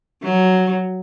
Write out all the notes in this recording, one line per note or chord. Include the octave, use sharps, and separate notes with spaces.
F#3